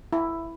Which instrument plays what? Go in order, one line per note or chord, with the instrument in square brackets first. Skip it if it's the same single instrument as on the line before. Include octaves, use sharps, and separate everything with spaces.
[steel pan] E4